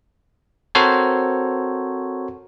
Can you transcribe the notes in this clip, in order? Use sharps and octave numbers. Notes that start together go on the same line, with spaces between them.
C4 F#4 A4 A#4 C5 C#5